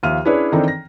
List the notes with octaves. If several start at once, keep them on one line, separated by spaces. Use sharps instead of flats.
D#2 F3 E5 F5 F6 D#7
C#4 D4 E4 G#4 B4 C#5
D#3 E3 C4 D4 D#4 A4
A#6